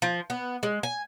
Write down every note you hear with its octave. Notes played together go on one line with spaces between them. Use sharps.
F3
B3
G#3
G#5